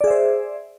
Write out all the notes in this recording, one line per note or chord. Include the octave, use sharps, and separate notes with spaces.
G#4 C5 D5 E5